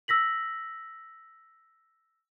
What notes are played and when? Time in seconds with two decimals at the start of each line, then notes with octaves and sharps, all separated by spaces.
0.08 E6 A#6 B6 F#7